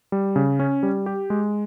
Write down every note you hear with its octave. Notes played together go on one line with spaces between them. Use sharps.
G3
C#3
C#4
G3
G4
G#3